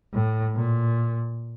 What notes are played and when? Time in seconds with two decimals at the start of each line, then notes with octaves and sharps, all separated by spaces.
0.13 A2
0.55 A#2